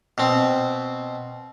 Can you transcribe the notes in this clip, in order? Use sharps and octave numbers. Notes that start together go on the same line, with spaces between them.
B2 C4